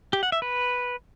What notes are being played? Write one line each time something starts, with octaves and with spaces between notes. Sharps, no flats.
G4
F#5
E5
B4